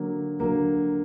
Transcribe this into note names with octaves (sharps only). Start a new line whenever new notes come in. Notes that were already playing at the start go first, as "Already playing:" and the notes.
Already playing: D3 F#3 A#3
D3 F#3 A#3